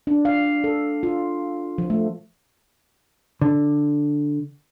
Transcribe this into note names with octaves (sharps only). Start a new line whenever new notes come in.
D4
F5
A4
F4
F3
A3
D3